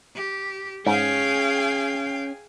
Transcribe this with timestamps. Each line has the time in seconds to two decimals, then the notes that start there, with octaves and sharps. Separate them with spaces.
0.16 G4
0.86 G#2 C#4 G#4 F5 G5 G#5